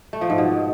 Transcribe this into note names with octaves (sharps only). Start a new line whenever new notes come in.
A3
F3
G#2
B2